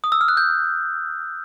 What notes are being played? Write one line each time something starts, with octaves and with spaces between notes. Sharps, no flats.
D#6
E6
F6
F#6
G6